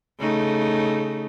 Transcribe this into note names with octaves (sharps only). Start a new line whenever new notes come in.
C#3 A3 D#4